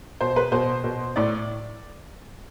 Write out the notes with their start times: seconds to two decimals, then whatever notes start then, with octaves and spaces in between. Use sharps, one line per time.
0.21 B2 C5
0.36 B4
0.52 B2 C5
0.84 B2
1.16 A2 D5